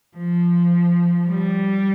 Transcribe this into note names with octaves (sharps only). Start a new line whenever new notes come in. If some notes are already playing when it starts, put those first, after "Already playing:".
F3
G3